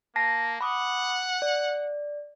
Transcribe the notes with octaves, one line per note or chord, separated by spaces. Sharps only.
A#3 A5 A#6 C7
F#5 B5 D6 D#6
D5